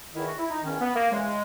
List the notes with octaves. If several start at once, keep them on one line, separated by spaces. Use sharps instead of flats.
E2 D#3 E4
F#4
E4
D#4
E2 D#3 C#4
B3
A#3
E2 C#3 E3 G#3